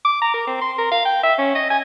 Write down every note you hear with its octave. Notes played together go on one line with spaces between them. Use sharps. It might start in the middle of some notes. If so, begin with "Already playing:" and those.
D6
A#5
A#4
C4
C6
A#4
F5
G5
E5
C#4
D#5
G#5